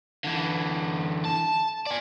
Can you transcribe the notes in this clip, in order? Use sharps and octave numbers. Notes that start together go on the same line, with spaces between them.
D3 E3
A5
D5 G#5